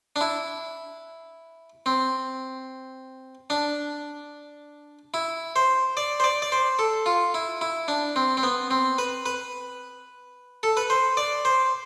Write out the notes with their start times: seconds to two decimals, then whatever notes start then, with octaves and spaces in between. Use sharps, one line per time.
0.16 D4
0.21 E4
1.86 C4
3.50 D4
5.14 E4
5.56 C5
5.97 D5
6.20 C5
6.24 D5
6.42 D5
6.52 C5
6.79 A4
7.06 F4
7.34 E4
7.61 E4
7.88 D4
8.16 C4
8.37 C4
8.43 B3
8.71 C4
8.98 B4
9.26 B4
10.63 A4
10.77 B4
10.90 C5
11.17 D5
11.45 C5